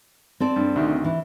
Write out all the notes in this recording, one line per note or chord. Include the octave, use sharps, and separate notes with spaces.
C4 A4 D5
G2
D2 C3 D#3
E3